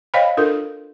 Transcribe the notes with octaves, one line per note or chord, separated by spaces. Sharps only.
C5 C#5 D#5 F5 G5 B5
D4 F4 A4 A#4